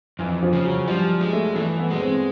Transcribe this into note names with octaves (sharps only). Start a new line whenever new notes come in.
F2 E3
F3
C#3
F#3
F3 G3
G#3
A3
E3 A3
B3
G#3
C4